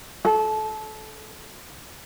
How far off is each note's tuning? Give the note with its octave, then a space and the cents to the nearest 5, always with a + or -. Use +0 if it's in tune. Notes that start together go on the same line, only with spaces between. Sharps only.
A4 -25